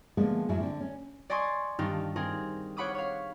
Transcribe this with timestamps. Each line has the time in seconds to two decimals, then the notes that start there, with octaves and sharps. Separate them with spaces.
0.17 D3 F3 G#3 A#3 B3
0.49 F#2 A2 F3 F#3 E4
0.60 D3 C4
0.81 C#4
1.30 D5 D#5 G#5 C6 C#6 D#6
1.79 G2 D#3 D4 D#4 F4 G4
2.16 C4 D#4 F4 G#4 A#4
2.77 F4 C#5 F#5 B5 D6 D#6
2.95 C#5 F5